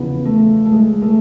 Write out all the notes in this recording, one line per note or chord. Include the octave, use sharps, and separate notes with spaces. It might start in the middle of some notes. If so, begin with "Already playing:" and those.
Already playing: E2 C#3 F3 B3
A3
A3
G#3
A3